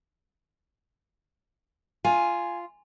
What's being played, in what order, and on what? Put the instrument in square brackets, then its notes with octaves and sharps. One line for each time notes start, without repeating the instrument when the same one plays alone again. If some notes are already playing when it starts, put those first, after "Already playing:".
[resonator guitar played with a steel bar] F4 [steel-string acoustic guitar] G#5